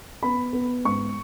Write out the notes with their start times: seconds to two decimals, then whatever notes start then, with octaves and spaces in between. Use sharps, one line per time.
0.23 B3 B5
0.53 B3
0.85 G#2 C#6